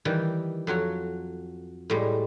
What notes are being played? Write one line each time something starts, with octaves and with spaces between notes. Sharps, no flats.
D#3 E3 G3 D5
F2 F#3 F#4 C#5
A2 G3 G#3